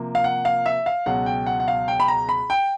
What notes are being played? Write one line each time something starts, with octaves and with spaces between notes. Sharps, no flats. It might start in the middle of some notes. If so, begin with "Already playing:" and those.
Already playing: C3 F3 A#3
F5
F#5
F5
E5
F5
C#2 B2 F#3 F#5
G5
F#5
F#5
F5
G5
B5
A#5
B5
G5